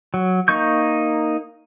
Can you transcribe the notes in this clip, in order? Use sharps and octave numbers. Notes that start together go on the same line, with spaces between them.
F#3
A#3 D#4 C#6 G6